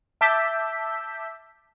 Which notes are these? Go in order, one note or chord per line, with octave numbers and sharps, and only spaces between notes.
E5 A5 D6 E6 G6 B6